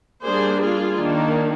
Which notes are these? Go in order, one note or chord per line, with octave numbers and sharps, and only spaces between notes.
G3 A#3 D4 G#4 C5
F4 G#4
D#3 A#3 D4